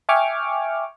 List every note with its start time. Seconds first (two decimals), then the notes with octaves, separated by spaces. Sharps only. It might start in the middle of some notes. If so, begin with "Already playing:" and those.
0.09 E5 G5 G#5 C#6 D6 F6